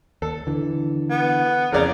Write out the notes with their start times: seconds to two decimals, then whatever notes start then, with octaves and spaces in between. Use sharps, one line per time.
0.22 D#2 A4
0.47 D3 E3
1.10 B3
1.72 F2 C#3 E3 A#4 D5 A#5